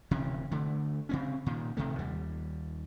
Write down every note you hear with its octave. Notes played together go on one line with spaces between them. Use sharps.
D1 C3 E3 C#4
D3 A3
C#3 C4 C#4
A#2 D#3
D1 C3 D#3 A3
D#2 G3